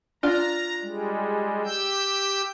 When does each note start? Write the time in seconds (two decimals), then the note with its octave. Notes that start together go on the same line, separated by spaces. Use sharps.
0.23 D4 F4 A#5
0.81 G3 G#3
1.65 G4 E6 G6